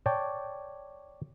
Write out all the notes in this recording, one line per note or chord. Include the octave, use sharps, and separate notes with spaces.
C#5 D5 G5 A5